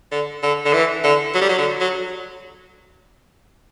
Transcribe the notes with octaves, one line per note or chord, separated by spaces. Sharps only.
D3
D3
D3
E3
D3
F#3
G3
F#3
D3
F#3